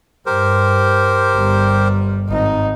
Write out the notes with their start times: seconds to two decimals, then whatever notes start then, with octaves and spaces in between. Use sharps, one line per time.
0.26 G2 G4 A#4 C5
1.34 G1 G3
2.28 G#1 D#4